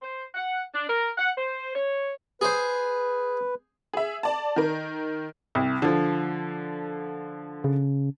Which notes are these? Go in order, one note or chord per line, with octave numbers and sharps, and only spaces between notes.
C5
F#5
D4
A#4
F#5
C5
C#5
G#4 B4 C5
G#4 E5
D5 A5
D#3 A#4
C2
D3 F3
C#3